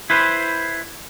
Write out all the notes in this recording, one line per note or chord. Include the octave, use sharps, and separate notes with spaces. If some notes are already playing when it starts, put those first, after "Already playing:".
E4 B4 C5